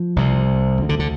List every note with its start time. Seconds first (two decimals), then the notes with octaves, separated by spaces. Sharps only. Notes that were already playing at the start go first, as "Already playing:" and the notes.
Already playing: F3
0.16 C2 C3
0.79 D2 D3
0.89 D3
0.99 D3